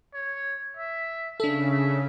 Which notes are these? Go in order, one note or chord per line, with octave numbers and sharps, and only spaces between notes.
C#5
E5
C#3 D4 A4 E5
E5